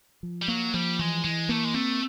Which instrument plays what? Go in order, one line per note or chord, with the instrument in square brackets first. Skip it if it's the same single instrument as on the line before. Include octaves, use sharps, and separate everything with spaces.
[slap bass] F3
[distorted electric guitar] G3
[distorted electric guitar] F#3 [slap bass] A#3
[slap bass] F3 [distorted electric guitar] G3
[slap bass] E3 [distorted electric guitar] G#3
[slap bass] E3 [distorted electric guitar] G#3
[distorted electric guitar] A3 [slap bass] A#3
[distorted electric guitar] G#3
[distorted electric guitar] A3 [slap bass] C4